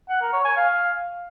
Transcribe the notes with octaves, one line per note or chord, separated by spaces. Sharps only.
F#5
A#4
C#5
G#5
F5